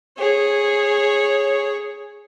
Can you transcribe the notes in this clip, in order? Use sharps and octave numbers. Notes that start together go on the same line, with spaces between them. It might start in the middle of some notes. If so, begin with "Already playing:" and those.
G#4 C#5